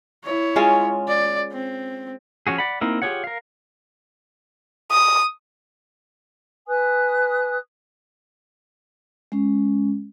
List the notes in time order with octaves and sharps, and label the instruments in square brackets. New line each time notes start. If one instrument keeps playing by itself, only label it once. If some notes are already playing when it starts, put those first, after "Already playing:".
[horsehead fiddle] E4 C#5
[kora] G#3 C#4 F4
[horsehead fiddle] D5
C4
[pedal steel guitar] F3 C#4 F#4 G#4
D5 F#5 B5
A#3 C4 D#4 E4 A#4
F4 G4 G#4 C#5 F#5
A#4 F5
[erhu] D#6
[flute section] B4 G#5 D#6 F#6
[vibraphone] G#3 C#4